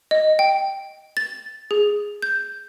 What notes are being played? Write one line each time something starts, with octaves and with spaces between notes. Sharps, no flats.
D#5
G5
A6
G#4
G6